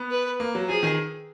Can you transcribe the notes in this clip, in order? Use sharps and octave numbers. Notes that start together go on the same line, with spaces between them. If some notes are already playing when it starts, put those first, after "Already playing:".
Already playing: B3
B4
A#3
F#3
F3 G#4
D#3